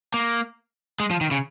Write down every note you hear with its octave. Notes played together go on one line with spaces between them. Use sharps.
A#3
G#3
F3
D#3
C#3